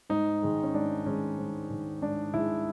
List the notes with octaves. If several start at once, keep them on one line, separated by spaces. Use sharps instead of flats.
G#2 D#4
D#3 G#3
C#4
G#2 D4
D#3 G#3 C#4
G#2
D#3 G#3
G#2 D4
D#3 G#3 E4